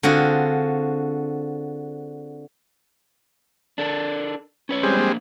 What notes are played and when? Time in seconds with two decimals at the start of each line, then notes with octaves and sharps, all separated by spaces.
0.03 D3 C4 F4 F#4 G#4
3.78 D4 A4 A#4
4.69 C#4 B4 C#5
4.83 G3 G#3 C4
4.97 A#3 D4